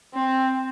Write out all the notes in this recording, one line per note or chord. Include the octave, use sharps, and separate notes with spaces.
C4